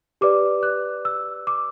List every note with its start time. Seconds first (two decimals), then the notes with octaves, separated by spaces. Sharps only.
0.21 G4 B4 D5 D6
0.63 F#6
1.05 E6
1.47 D6